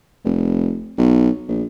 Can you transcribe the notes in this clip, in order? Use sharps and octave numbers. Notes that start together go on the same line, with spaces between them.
F1
B1
A#1